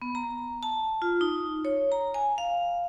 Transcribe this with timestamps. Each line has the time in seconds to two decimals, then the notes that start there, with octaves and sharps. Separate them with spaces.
0.02 B3
0.15 A#5
0.63 A5
1.02 F4
1.21 D#4
1.65 C#5
1.92 A#5
2.14 G#5
2.38 F5